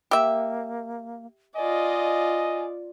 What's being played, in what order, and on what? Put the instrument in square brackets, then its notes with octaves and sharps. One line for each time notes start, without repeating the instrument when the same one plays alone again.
[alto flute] A#3 [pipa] G4 E5
[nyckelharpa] F4 D5 [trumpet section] D#5 [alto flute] G#5